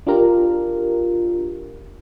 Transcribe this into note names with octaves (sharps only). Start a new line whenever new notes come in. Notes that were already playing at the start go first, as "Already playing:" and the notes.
D4 F4 G4 A#4